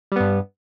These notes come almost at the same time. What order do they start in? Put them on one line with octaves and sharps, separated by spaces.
G3 B3 G2